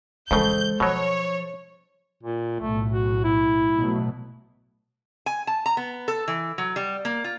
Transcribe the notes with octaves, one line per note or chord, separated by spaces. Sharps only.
F2 C#3 E3 G#3 A4 C5 G6
B2 F3 F#3 C#5
A#2
B1 A2 A3
F#4
E4
B2 F#3 A3
G#5
A5
A#5
B3
A4
E3
F#3
G3
A#3
F4